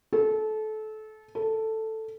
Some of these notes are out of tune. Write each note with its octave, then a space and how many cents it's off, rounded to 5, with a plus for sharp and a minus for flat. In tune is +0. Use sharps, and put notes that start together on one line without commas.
A4 -25
A4 +5